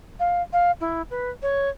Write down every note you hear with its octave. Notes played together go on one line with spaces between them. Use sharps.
F5
F5
E4
B4
C#5